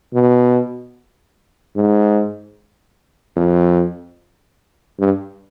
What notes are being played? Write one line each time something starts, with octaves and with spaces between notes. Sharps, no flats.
B2
G#2
F2
G2